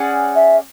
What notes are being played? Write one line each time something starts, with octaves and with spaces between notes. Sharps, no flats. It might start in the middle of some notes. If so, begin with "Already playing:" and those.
Already playing: C#4 G#4 D5 F#5
E5